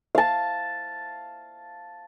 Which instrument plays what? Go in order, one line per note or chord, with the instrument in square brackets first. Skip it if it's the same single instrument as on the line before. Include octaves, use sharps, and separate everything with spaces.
[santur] F5 A5